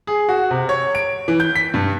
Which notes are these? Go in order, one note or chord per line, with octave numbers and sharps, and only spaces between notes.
G#4
F#4
C3
C#5
D7
E3
G6
B6
G2